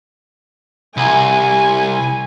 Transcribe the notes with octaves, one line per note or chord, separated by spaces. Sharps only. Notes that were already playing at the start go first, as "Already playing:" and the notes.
C2 G#5